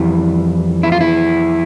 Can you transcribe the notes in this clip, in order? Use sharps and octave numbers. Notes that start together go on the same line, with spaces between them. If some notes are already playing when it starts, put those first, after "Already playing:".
Already playing: F2 E3 G3 E4
E4
F4
E4